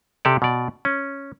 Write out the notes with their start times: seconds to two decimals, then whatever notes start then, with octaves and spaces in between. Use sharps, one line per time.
0.25 C3 G4 A4 D5
0.42 B2 D5
0.85 C#4